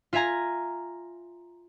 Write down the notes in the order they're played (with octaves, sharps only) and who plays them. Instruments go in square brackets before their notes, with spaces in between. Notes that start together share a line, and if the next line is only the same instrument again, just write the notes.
[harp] F4 E5 F5 G#5 A#5